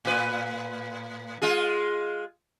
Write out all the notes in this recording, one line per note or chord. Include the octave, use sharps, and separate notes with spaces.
A2 B4
G#3 F4 G#4